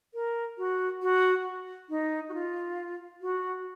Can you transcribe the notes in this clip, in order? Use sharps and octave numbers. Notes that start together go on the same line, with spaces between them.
A#4
F#4
F#4
D#4
F#4
F4
F#4